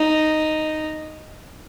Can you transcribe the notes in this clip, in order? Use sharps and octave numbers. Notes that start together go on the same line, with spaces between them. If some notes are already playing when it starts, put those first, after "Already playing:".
Already playing: D#4